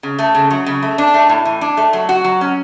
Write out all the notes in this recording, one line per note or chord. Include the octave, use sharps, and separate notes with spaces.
C#3
A3
C#3
F#3
C#3
A3
D4
A3
A2
E3
D4
A3
F#3
F#4
F#3
C#4